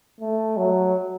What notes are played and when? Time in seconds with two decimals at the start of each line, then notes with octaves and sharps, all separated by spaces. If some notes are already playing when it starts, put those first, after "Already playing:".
0.21 A3
0.57 F#3